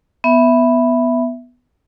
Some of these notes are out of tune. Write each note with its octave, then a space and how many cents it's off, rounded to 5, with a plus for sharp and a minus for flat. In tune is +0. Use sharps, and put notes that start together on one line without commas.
B3 +0 E5 +0